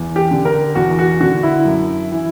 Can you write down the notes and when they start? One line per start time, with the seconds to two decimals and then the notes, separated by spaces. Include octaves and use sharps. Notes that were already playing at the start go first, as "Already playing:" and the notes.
Already playing: E2
0.16 G4
0.31 D3
0.45 A#4
0.75 E2 F#4
0.99 F#4
1.20 D3 F#4
1.43 E4
1.65 F#2
2.12 E3